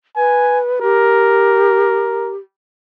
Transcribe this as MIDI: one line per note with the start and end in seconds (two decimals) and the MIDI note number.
0.17 0.80 71
0.17 0.59 80
0.82 2.36 67
0.82 2.32 70